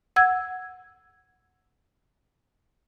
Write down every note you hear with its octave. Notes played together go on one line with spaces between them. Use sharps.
F#5 E6 G#6